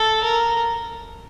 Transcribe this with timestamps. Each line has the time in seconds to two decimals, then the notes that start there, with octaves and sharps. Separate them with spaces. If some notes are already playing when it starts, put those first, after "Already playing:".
Already playing: A4
0.24 A#4